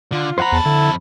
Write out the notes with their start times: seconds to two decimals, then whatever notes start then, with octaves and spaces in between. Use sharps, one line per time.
0.12 D3 F4
0.38 F2 C5 F#5 A#5 B5
0.52 E2 A5
0.65 D3 E4